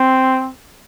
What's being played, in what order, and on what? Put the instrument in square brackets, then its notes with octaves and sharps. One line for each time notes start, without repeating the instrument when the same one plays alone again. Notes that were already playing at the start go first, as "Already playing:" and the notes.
Already playing: [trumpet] C4